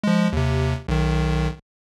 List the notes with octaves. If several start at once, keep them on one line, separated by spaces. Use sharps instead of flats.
F3 G#3
D#2 C3
B1 D#3